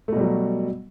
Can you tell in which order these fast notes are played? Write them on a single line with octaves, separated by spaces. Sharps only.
A3 B2 G3 F#3